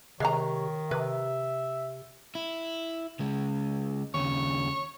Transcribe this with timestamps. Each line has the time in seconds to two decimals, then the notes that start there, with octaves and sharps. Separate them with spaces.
0.20 C3 D#3 G#3 C#5 F5 A#5
0.91 C3 B4 E5
2.35 E4
3.19 C#3 G#3
4.14 D#2 C#3 C#5